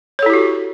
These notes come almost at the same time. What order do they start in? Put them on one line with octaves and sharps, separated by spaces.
C#5 A4 E4 G4 F#4